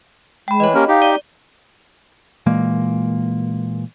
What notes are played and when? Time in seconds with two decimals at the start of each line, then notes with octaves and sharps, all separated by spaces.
0.48 G#3 G5 B5
0.60 E3 C#5 D#5
0.74 A#3 C#4 G4 A#4
0.88 D#4 G4 F5
1.02 D5
2.46 A#2 E3 G#3 A#3